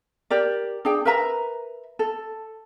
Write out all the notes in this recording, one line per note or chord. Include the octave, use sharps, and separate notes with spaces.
G4 A#4 D5
D4 G#4 G5
A#4 B4 E5 A#5
A4